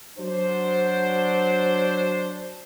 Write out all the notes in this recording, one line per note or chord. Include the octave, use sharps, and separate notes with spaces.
F#3 D4 C5